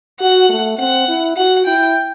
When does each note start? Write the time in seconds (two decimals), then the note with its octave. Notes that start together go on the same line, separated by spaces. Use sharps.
0.20 F#4 F#5
0.49 A3
0.79 C4 F#5
1.08 E4
1.37 F#4 F#5
1.66 E4 G5